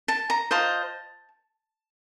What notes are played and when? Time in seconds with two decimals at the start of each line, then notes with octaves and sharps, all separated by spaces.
0.08 A5
0.30 A#5
0.51 F4 C5 D#5 A5